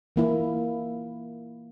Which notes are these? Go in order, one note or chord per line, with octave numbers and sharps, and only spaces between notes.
E3 A#3 E4